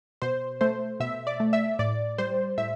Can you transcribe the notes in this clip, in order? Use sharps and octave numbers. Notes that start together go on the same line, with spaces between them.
B2 C5
A3 C5
B2 E5
D5
A3
E5
A2 D5
G3 C5
A2 E5